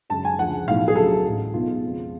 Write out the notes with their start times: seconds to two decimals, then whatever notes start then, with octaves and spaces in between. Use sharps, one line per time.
0.09 F#2 C#3 G#3 A5
0.25 G#5
0.39 D2 C#3 F3 F#5
0.67 B1 A2 F3 F5
0.88 G#4
0.96 D2 C#3 F#3 A4
1.25 A1 A2 G#3
1.54 B1 B2 G#3 B3 F4
1.82 F2 C#3 G#3